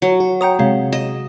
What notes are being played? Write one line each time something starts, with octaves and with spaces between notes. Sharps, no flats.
F#3
F#4
C#5 F#5 G5 A#5 D#6
C3 G#3 C#5 F5
D#5 E7